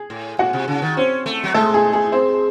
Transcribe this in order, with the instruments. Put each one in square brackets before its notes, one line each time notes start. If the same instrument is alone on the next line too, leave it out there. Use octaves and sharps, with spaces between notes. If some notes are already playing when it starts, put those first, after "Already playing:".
Already playing: [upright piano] G#4
[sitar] A2
[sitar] A2 [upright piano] F#4 F#5
[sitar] C3
C#3
D#3
[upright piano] C4 C5 [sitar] C#4
[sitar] A3
F#3
[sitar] G#3 [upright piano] A3 A4
[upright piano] G#4
G#4
C4 C5